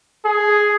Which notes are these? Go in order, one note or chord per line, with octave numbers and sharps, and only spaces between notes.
G#4